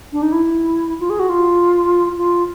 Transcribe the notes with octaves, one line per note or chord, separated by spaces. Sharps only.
D4
D#4
E4
F4
G#4
F#4
F4
F4